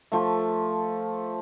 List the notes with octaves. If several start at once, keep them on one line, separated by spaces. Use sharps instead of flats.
F3 A3